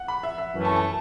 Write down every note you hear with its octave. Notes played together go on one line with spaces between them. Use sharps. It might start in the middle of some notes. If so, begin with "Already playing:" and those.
Already playing: F#5
B5
E5
E5
F#2 E3 A3 C#4
A5
A5